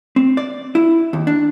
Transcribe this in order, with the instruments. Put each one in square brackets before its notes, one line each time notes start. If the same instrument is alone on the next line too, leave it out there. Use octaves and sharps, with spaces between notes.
[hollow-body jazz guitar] C4
D5
E4
D#2
D4